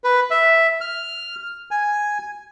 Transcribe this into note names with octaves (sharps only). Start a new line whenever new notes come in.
B4
E5
F6
G#5